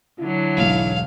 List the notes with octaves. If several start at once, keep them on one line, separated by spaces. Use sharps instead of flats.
D3 F#3 E4
E1 B1 G#2 F5